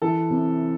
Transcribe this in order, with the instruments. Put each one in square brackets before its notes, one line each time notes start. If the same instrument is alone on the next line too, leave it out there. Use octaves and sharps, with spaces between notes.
[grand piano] E3 A4
C3